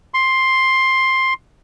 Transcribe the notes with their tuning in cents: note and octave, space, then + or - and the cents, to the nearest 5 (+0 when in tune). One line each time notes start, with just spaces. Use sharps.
C6 +10